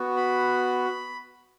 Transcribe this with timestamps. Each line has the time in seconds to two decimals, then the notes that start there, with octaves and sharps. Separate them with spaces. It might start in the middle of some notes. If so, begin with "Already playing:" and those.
Already playing: B3 F#4
0.16 B5